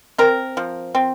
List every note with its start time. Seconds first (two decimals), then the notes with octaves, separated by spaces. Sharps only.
0.18 C4 A#4
0.57 F3
0.95 C4